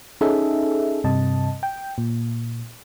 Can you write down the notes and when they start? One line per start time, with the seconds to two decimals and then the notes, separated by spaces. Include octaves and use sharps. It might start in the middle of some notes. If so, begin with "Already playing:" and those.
0.21 C#4 D#4 G#4 A4 E5
1.04 G2 C3 D#5 A5
1.63 G5
1.98 A#2